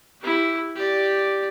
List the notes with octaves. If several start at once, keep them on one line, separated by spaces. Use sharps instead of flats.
E4 G4
G4 D5